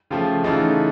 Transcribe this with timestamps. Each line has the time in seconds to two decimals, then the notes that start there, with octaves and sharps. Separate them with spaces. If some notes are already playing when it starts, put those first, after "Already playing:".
0.11 C#3 F3 A3 F4 G4
0.44 C#3 E3 A3 D#4 F4